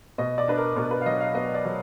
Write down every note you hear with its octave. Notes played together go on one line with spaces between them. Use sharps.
B2 D#5
D5
D4 B4
A#4
B2 A#4
B4
F5
F#3 D#5
F5
B3 D#5
D5
F#3